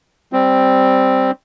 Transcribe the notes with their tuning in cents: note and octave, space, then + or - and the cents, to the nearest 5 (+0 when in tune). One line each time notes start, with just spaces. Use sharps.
G3 +0 C4 +0